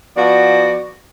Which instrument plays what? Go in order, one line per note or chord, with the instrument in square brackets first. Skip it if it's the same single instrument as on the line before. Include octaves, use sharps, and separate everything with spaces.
[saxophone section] F3 B3 F#4 D5